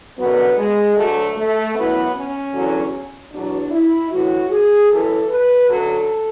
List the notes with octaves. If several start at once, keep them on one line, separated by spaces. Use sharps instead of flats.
F#2 D3 F#3 B3
G#3
D2 D3 F#3 A3
A3
F#2 E3 B3
C#4
E2 D3 F#3
E2 B2 F#3 D4
E4
A2 E3 F#4
G#4
F#2 E3 A4
B4
F#2 D3 F#3 A4